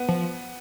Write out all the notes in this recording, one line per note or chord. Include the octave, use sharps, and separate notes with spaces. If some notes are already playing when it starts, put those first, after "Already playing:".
Already playing: B3
F3